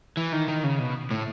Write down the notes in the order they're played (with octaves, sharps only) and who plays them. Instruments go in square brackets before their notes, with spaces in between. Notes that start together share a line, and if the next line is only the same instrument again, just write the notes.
[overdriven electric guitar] E3
D#3
D#3
C#3
B2
A2